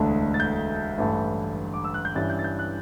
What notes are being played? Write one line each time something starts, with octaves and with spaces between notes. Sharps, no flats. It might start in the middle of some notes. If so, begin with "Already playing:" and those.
Already playing: E1 D2 D3 A3
A6
G6
A1 G2 E3 A3
D6
E6
F#6
G6
G2 E3 G3 C#4 E4 A6
G6
A6
G6
F#6